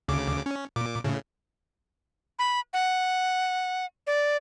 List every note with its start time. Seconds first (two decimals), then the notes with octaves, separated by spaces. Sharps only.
0.08 D2 C#3 D6
0.46 C#4
0.76 A#2 D6
1.04 A2 C#3
2.39 B5
2.73 F#5
4.07 D5